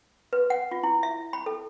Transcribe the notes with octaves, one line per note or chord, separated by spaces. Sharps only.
B4
F#5
F4
E4
E5
B5
A4